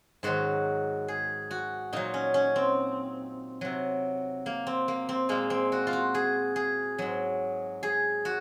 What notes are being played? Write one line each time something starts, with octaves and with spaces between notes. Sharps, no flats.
G#2 D#3 F#3 F#4
G#4
F#4
A#2 F#3 D#4
C#4
C#4
C4
C3 F#3
A#3
C4
A#3
C4
A#2 G#3 A#3
C4
F#4
F4
F#4
G#4
G#4
G#2 F#3
G#4
F#4